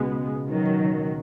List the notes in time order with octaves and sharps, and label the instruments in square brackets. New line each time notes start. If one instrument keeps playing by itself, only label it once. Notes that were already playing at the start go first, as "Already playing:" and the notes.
Already playing: [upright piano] C#2 B2 [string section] G#3 B3
[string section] D#3 F#3